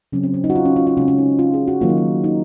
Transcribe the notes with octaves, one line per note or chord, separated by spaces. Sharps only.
C#3 F#3 C4 C#4
C4
C#4
D#4
F#4
F4
C#4
F4
F4
C#3 G#3 C4 C#4
C#4
D#4
F4
G#4
F#4
D#3 F#3 A#3 F4
D#4
F4
D#4